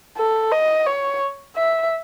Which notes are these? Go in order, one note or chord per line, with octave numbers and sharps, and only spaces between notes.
A4
D#5
C#5
E5